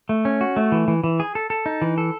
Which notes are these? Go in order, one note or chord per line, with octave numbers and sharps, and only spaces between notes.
A3
C#4
F#4
A3
E3
E3
E3
G#4
A4
A4
D#4
E3
A4